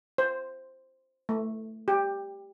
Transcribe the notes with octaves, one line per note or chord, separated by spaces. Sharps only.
C5
A3
G4